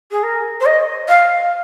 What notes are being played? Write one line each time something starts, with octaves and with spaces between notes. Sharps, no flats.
G#4
A#4
C5
D#5
F5